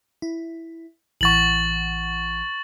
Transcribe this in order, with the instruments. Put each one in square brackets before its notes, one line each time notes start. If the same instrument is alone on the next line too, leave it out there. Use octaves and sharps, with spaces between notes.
[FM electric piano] E4
[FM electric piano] A1 E3 F#5 [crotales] C#6 A6 F#7